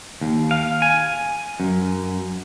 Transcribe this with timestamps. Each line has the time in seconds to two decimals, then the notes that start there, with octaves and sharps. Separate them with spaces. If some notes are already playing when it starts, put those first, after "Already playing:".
0.21 D#2
0.51 F5
0.82 G#5
1.60 F#2